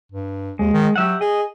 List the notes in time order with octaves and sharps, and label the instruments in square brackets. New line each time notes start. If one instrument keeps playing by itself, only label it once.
[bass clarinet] G2
[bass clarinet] D#2 [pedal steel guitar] G#3
[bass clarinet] D#3
[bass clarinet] F#3 [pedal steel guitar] G4 E5 F#5
[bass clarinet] G#4 [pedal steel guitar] D#5